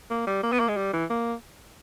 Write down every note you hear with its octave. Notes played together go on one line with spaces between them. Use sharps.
A#3
G3
A#3
B3
A#3
G#3
G3
E3
A#3